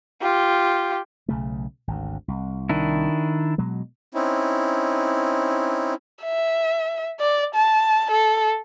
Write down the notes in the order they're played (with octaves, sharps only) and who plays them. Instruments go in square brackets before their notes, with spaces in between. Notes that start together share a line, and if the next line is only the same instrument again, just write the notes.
[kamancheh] F4 G4
[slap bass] B1 C#3 A3
G#1 D2
C2
[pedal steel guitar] D#3 D4 E4
[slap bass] B2 F#3 G#3
[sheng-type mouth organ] C4 C#4 D#4 E4
[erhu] E5
D5
A5
A4